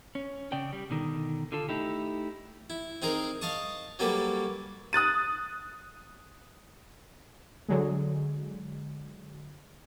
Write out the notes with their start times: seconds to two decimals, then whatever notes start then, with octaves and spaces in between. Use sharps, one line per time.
0.15 C#4
0.52 C#3 D5 G5
0.73 G3
0.90 B2 D3 D#3
1.52 D3 F4 A4
1.69 A3 D#4 E4 G4
2.70 E4
3.02 C4 D#4 G#4 A#4
3.41 D#5 F5 A5 C#6 D#6
3.99 F#3 G3 A#3 C#4 A4 B4
4.93 D#6 F#6 A6 D#7
7.68 D3 F#3 G#3